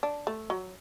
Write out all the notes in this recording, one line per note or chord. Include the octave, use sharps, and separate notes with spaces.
D4
A3
F#3